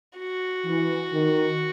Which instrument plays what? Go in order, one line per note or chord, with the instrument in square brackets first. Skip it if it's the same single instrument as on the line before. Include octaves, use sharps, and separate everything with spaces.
[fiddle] F#4
[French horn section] E3
D#3